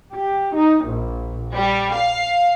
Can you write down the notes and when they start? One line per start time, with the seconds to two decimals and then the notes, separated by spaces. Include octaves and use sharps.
0.13 G4
0.54 D#4
0.87 A#1
1.55 G3
1.96 F5